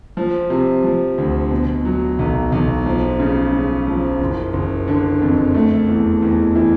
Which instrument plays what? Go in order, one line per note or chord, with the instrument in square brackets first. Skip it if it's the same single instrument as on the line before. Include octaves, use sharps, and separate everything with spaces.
[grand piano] F3
C3
F3
D2
B2
F#3
B1
B1
F3
C#3
C#3
F3
F#1
F#1
D3
F2
A3
E2
E2
E3